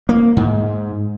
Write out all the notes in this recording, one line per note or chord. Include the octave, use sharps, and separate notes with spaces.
A#3
G#2